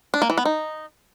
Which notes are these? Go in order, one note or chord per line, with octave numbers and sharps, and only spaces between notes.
D4
A#3
E3
B3
D#4